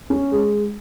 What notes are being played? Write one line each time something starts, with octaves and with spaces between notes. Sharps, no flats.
C#4
G#3